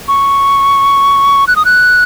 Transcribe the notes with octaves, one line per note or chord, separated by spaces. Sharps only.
C#6
F#6
D#6
F#6